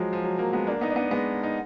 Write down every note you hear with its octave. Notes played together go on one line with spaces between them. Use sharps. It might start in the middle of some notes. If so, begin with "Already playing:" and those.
Already playing: F3 F#3 G#3
F3
F#3
F#3 A#3
G#3 B3
A#3 D4
B3 D#4
D4
B3 D#4
G#3 B3
D#4